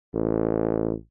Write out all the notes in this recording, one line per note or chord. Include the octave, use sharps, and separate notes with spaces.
A1